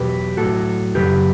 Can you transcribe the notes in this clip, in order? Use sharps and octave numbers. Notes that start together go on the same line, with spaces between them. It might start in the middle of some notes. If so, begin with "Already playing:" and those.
Already playing: E2 B2 F#3 G4 B4
A2 F#3 F#4 A4
F#2 C#3 F#3 G4 B4